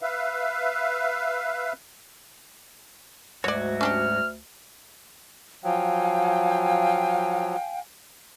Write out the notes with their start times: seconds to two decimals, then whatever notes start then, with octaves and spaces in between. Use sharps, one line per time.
0.02 B4 E5 F5
3.44 D2 G#2 F#3 F#4 C#5 D5
3.81 C#4 D4 G4 F6
5.64 F3 F#3 F5 G5 G#5